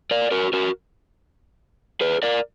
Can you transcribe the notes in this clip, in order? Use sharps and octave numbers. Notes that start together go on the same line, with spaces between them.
A#4 D5
F#4 A#4
F#4 A#4
G#4 B4
A#4 D5